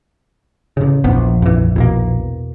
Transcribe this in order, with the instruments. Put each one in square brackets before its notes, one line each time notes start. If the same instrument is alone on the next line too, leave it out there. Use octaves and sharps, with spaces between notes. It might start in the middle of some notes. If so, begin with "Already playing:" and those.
[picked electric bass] A1 C#3
[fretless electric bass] A#1 [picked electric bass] E2 F3 B3
[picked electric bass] F2 E3
E2 B2 A#3